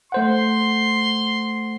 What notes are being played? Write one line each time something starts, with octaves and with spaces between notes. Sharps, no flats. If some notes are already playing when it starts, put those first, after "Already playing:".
A3 C5 F#5 C6